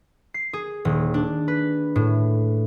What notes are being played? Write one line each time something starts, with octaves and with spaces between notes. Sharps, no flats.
C7
G#4
D#1
D4
B4
A2